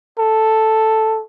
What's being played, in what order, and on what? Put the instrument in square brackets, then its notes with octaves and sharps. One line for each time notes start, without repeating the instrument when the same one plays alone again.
[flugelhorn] A4